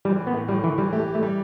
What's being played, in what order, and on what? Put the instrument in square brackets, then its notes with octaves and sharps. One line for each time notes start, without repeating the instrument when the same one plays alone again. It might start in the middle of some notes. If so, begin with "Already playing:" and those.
[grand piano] E3 [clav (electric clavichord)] G3
[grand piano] A2
[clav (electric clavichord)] B3
[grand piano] A2
[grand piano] A2 [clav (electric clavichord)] G3
[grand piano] A2 [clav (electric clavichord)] E3
[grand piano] E3 [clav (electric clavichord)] G3
[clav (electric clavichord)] A3 [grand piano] G4
[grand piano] G4
[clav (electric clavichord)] A3
[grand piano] G3